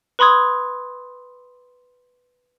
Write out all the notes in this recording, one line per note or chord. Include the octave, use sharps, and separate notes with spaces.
B4 B5 C6 D#6 G#6